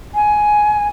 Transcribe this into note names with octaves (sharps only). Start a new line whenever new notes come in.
G#5